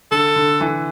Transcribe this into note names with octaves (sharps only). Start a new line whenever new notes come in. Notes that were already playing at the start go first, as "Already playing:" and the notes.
D3 A4
D3
E3